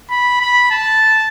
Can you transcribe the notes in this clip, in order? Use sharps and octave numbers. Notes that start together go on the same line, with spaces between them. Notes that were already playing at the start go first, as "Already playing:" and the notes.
B5
B5
A5